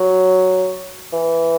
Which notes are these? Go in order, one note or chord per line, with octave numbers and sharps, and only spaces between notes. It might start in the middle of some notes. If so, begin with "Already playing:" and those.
Already playing: F#3
E3